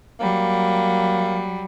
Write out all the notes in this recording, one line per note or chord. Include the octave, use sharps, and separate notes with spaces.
F#3 G3 A#3